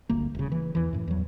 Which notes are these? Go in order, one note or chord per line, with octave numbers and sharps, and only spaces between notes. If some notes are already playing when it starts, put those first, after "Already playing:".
G1 D2 A#3
D#1 C#3
E3
E2 E3
F#2 A2
E2 F#3